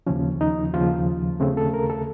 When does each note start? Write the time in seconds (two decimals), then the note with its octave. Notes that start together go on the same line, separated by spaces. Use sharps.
0.07 D#2 C#3 F3 C#4
0.41 D#4
0.74 D#2 C#3 F3 F4
1.40 D#2 C#3 A3 C4
1.57 A4
1.74 A#4
1.90 A4